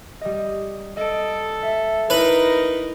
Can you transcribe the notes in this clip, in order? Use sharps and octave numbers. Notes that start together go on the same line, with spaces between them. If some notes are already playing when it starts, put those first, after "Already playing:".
G3 D#5
A4 D#5 D7
E5
D#4 E4 A#4 B4